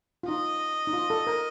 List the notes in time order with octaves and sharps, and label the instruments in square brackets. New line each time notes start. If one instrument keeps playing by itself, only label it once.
[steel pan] F4
[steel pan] D#4 [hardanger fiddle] D#5
[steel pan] D#4
F4
A4
A#4